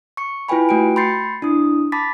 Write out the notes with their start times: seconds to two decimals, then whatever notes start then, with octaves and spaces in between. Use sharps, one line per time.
0.17 C#6 C#7
0.49 E4 F4 B4 G5 G#5 B5
0.69 A3 F#4 G5 D7
0.96 B5 C6 G6 A6 C7 C#7
1.42 D4 E4 D#6
1.92 A5 B5 D6 A6 B6